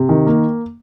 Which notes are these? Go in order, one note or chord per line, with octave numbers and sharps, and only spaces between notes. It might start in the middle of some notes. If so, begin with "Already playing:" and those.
Already playing: C3
D#3
A#3